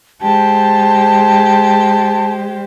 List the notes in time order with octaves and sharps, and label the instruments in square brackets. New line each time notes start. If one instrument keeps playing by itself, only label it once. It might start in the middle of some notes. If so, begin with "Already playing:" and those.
[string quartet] G#3 G4 C5 [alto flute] A5